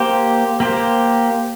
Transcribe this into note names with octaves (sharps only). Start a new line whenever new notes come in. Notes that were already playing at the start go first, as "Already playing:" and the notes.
Already playing: A#3 G4 C5
A#3 G4 C5